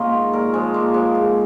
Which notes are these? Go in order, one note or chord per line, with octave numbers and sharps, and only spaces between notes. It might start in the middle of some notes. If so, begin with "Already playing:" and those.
Already playing: G#2 A#3 C#4 D#4 F4 G#4
D#3
A#2 A#4
F3 G#3
A#2 A#3
F3 G#3
G#2